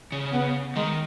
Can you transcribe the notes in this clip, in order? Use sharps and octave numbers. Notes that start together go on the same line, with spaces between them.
C#3
C#3 B3
D#3 G#3